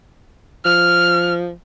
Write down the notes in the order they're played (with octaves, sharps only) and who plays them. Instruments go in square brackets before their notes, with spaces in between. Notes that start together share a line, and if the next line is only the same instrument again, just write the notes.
[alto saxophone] F3 [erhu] F6